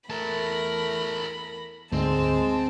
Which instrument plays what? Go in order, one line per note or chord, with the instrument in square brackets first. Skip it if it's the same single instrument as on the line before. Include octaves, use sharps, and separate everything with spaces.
[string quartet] E2 B5 A#6 [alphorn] A3 [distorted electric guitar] A#4 A5
[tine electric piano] D2 G#2 [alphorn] G#3 [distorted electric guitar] C4 [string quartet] C5 A5